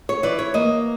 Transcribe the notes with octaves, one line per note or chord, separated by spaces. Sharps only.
C#5
E3 D5
C#5
A#3 D#5